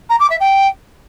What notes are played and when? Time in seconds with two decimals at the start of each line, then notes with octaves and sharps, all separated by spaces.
0.10 A#5
0.20 D6
0.30 E5
0.40 G5